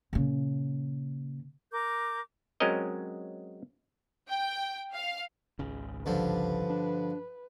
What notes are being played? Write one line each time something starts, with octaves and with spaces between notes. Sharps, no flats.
A#2 C#3
A#4 D6 G6
F#3 G#3 C4 C#4 A#4 D#5
G5
F5
G#1 C#2 C#3
G2 D3 F3 B4
D4